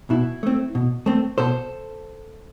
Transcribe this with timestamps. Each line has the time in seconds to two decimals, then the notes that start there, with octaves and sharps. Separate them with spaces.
0.10 B2 E4
0.43 A3 C4
0.75 B2
1.06 A3 C4
1.38 B2 A4 C5